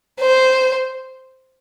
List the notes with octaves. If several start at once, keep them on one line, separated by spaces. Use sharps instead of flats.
C5